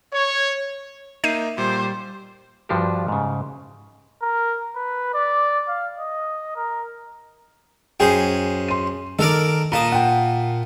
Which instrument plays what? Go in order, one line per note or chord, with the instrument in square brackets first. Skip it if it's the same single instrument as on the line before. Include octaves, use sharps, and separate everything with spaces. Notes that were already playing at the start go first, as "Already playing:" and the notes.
[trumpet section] C#5
[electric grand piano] A#3 D#4 E5 [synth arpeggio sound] G6 C7 D#7
[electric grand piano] A#2 [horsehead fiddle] G3 [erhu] C5
[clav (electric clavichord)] G2 F3 D4 F#4 G4
G#2 C#3
[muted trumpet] A#4
B4
D5
F5
D#5
A#4
[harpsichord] F#2 G#4 C5 [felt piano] G5 G#5
[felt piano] C6 D#7
[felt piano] D#3 [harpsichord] A4 A#4 D5
[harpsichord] A#2 A5 D#6 [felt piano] A#5
[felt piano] F#5 G5